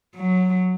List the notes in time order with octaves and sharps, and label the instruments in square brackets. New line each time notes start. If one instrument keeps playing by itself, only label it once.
[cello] F#3